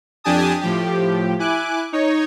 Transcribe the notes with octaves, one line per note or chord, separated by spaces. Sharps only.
F2 D4 G4 G#5 A5 D#6
A2 F3 G4
E4 G#5 D6 F#6
D#4 C#5